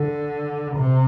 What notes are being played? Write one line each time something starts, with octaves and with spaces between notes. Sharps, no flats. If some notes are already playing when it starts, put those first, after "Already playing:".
Already playing: D3
C3